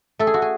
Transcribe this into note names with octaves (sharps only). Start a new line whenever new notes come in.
A3 A4
G#4
F#4
G#4